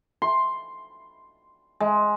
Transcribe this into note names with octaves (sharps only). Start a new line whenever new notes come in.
C6
G#3